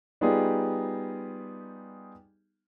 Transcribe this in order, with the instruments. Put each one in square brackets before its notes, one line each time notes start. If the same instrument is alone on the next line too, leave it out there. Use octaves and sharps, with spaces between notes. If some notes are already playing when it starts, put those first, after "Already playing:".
[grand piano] G3 B3 D#4 F4 G4 G#4